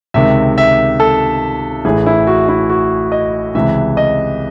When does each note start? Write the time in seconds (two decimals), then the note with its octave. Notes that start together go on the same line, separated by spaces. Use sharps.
0.14 C#2 C3 D#3 E5
0.58 E5
1.00 A4
1.85 A1 A2 E3 G#4
2.06 E4
2.27 F#4
2.49 E4
2.70 F#4
3.12 D#5
3.55 C#2 C3 E3 E5
3.97 D#5